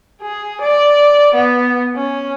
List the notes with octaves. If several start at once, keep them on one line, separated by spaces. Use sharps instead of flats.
G#4
D5
B3
C#4